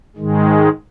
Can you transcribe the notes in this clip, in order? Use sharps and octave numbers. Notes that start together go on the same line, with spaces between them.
G#2 D#3 G#3